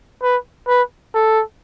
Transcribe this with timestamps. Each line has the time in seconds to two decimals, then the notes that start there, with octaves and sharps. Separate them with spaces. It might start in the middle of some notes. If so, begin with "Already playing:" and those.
0.23 B4
0.68 B4
1.14 A4